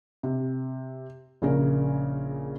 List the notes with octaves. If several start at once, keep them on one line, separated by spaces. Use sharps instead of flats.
C3
A#1 C#3 A#4